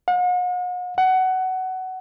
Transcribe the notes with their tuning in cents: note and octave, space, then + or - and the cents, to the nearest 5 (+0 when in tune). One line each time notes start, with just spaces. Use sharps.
F#5 -45
F#5 +15